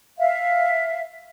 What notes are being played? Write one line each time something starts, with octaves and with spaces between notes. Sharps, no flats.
E5 F5